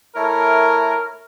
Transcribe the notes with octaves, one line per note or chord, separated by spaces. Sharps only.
A3 E4 A#4 C#5